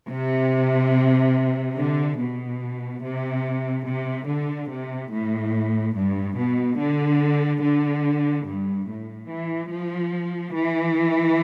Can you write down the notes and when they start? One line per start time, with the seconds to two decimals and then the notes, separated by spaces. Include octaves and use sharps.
0.10 C3
1.77 D3
2.19 B2
3.03 C3
3.86 C3
4.28 D3
4.69 C3
5.11 A2
5.95 G2
6.37 B2
6.78 D3
7.62 D3
8.45 G2
8.87 A2
9.29 E3
9.71 F3
10.54 E3